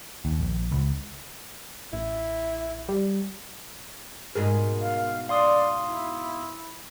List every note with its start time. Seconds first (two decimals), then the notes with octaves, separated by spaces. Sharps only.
0.25 D#2
0.40 A#1
0.72 C#2
1.93 A1 E4
2.89 G3
4.35 G#2 B2 G#4 A#4
4.81 F5
5.29 D5 F5 C6 D#6
5.88 E4